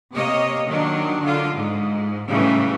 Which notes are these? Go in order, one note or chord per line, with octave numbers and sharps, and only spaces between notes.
C3 A#3 C#5 D#5
D#3 F#3 D4
D3 F4
G#2
A2 C#3 E3 F#3 G3 A3